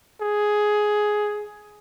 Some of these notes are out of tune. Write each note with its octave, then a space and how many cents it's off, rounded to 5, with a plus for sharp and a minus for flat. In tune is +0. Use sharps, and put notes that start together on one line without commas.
G#4 +10